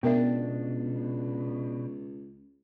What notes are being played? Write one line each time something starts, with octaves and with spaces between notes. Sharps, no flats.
C#2 B2 B3 D4 A#4 E5